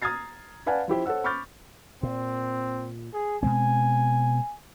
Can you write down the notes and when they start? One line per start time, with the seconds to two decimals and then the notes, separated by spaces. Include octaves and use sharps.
0.02 A#5 D#6 F6 G#6 A6 C7
0.66 B4 D5 F5 F#5 G#5 A5
0.88 F3 E4 G4 C5
1.06 A4 C5 C#5 F#5 E6
1.24 B5 C#6 D6 F6 G6 A6
2.03 A#2 C4
3.13 G#4
3.43 B2 G#3 C4 G#5